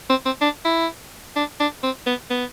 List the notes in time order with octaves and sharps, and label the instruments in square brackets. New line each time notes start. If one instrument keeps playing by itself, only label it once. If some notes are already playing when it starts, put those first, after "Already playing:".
[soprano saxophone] C4
C4
D4
E4
D4
D4
C4
B3
B3